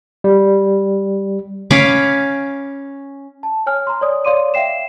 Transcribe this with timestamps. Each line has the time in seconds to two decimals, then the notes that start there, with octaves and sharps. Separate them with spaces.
0.24 G3
1.71 C#4 F5 B5 D6
3.43 A5
3.66 C#5 G#5 F6
3.87 A#5 C6
4.01 C#5 D5 D#6
4.25 C#5 D5 F5 C6 D6 D#7
4.54 E5 F5 G5 C7 E7